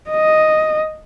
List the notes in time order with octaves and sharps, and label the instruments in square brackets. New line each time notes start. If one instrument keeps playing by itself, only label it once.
[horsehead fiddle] D#5